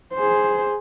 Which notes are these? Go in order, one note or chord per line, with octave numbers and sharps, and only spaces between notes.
G#4 C5